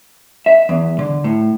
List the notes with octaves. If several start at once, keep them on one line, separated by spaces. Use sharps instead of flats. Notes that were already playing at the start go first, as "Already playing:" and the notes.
E5
E2
D3
A2